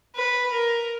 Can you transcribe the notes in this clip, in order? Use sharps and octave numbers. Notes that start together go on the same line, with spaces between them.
B4
A#4